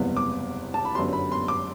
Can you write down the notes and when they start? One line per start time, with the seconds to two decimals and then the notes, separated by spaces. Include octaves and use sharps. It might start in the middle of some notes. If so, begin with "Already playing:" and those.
Already playing: F#1 E2 C3 G3 B3
0.17 D6
0.74 A5
0.85 B5
0.95 G1 F#2 D3 G3 B3 C6
1.13 B5
1.32 C6
1.48 D6